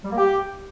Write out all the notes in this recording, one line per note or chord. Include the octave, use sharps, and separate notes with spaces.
G3
A#3
G4